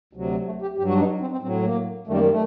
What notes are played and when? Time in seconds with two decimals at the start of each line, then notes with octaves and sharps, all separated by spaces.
0.13 D2 C3 F#3
0.46 A3
0.62 G4
0.78 G2 F#3 G4
0.88 F#4
0.94 D4
1.00 D#4
1.21 C4
1.32 C4
1.42 A2 F#3 C4
1.64 A#3
2.07 F#2 D#3 G3 A3
2.15 A#3
2.23 G3
2.31 A3